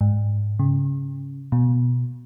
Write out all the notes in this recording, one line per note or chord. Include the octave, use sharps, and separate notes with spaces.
G#2
C#3
B2